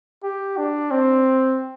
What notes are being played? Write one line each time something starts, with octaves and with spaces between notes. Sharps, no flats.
G4
D4
C4